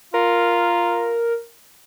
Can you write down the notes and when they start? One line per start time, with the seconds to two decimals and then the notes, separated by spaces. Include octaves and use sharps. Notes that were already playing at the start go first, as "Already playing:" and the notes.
0.14 F4 A#4